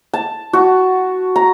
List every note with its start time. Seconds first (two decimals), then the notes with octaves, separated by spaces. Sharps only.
0.13 A5
0.53 F#4
1.36 A#5